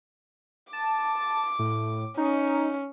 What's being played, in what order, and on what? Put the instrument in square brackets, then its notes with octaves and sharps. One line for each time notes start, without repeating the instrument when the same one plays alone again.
[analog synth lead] A5 [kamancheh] D6
[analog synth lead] A2
[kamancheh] C#4 [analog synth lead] D#4